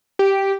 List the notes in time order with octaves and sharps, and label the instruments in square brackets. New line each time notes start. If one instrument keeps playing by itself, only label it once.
[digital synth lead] G4